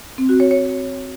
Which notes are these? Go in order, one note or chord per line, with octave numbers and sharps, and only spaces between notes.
C4
F#4
C#5
C#5